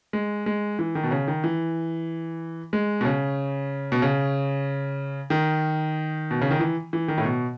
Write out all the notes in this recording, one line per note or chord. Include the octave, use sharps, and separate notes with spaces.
G#3
G#3
E3
D#3
B2
C#3
D#3
E3
G#3
B2
C#3
B2
C#3
D#3
B2
C#3
D#3
E3
E3
D#3
A2
B2